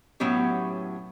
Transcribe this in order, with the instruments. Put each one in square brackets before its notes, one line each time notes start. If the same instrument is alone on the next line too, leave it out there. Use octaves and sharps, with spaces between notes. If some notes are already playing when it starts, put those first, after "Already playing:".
[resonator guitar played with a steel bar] A2 F#3 B3 C#4 G4